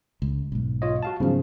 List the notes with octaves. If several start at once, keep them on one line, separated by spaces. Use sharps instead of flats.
C#2
B1 G#2
F4 C#5 D#5
F#4 F5 A5
G#2 C#3 F3 F#3 B3